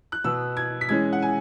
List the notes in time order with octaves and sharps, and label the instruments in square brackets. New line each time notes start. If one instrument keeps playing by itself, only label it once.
[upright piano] F#6
B2 B3 E6
G#6
B6
E3 G#3 C#4 G#6
F#5
G#5